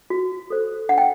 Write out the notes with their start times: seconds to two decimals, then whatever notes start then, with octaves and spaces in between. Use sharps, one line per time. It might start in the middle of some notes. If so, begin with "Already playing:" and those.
0.10 F#4
0.50 A4 C5
0.89 D4 F#5
0.98 G5